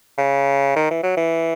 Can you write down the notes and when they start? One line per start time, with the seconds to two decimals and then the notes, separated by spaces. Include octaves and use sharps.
0.18 C#3
0.76 D#3
0.91 E3
1.03 F#3
1.17 E3